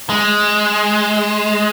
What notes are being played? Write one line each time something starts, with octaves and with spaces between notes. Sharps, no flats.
G#3